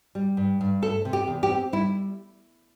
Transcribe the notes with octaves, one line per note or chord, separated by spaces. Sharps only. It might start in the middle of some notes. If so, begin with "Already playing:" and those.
G3
G2
G2
A3 A4
C3
G4
E2
G4
C4
G3 E4